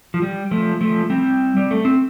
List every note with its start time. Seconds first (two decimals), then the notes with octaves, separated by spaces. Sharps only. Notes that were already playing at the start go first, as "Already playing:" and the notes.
0.14 F3
0.22 G3
0.51 F3 A3
0.81 F3 A3
1.10 G3 C4
1.57 G3
1.71 A3
1.85 C4